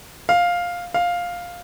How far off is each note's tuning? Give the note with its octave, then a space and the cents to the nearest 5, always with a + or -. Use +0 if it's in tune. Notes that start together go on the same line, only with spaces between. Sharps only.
F5 +5
F5 +5